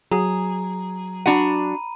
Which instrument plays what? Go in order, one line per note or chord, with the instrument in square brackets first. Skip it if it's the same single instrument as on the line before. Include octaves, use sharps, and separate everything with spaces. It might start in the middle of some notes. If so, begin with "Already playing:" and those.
[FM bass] F#3 [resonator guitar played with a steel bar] G#4 [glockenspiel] A#5
[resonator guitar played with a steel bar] D4 F#4 F#5 [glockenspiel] A#5 B5 D#7